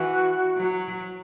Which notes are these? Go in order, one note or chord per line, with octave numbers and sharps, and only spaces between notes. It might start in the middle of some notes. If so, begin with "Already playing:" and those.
Already playing: E3 F#4
F#3